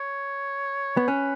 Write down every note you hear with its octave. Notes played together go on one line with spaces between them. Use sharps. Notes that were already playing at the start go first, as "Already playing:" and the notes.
Already playing: C#5
B3 C#5
C#4 B4